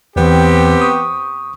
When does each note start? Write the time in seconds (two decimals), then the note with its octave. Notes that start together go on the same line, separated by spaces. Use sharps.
0.16 E2 E3 B3 C4 G4
0.82 C#6 D#6